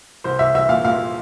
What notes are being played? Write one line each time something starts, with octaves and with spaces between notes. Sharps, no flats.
C2 C5
C2 E5
C2 E5
A#2 F5
A#2 F5